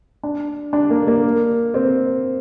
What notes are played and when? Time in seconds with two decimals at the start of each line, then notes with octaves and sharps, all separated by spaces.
0.23 D4
0.73 D4
0.90 A#3
1.08 A#3
1.74 C4